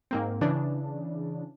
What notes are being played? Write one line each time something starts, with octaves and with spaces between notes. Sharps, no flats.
G#2 A#3 C4
C#3 E3 D4